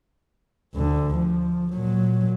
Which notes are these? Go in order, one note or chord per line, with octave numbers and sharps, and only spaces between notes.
D2 D3
F3
A#2 F#3